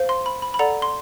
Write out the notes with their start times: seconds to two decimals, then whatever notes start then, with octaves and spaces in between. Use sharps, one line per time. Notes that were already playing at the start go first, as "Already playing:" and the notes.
Already playing: C5 F5
0.09 C6
0.26 B5
0.42 B5
0.54 B5
0.59 A4 D5 F#5 A#5
0.82 C6